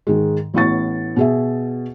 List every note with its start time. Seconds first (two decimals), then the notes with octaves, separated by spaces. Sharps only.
0.07 G#2 D#3 G#3
0.54 A1 A2 B3 C#6 A6
1.17 B2 G#4 E5